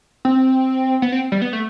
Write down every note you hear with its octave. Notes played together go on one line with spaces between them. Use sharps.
C4
B3
C4
G3
B3
A3